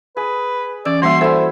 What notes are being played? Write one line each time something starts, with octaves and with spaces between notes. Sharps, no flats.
G#4 B4
E3 C#4 D5 E6
E3 G3 A#3 F#4 E5 C6
E4 A4 C5 D5 G#5 E6